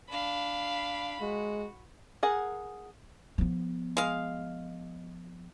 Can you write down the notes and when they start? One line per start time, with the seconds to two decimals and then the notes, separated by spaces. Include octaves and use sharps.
0.10 D4 F5 B5
1.21 G#3 F#4
2.23 G#4 A#4 F#5
3.38 F3 B3
3.97 G#3 F5